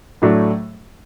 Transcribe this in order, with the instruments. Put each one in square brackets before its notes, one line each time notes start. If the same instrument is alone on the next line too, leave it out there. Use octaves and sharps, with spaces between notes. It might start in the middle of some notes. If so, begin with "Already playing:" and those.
[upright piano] A2 F#3 A3 D4